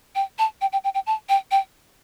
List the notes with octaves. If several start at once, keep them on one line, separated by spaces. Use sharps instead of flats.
G5
A5
G5
G5
G5
G5
A5
G5
G5